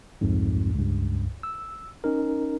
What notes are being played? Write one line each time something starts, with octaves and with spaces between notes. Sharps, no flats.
C2 F2 G#2
C#2 G2
E6
C#4 D#4 A#4